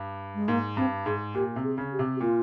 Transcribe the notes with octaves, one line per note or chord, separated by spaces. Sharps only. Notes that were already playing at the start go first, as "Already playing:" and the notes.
Already playing: G2
G#3
G#2 A#3
G2 C4
G#2 G#4
A#2 G4
C3
G#4
C#3
G4
C3
G4
A#2 F4